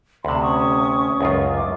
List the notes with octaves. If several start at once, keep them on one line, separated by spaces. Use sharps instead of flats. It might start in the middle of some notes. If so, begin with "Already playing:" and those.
D2 C3 A5 B5 C6
C#4 C#6 D#6
C#2 F#2 F4
D6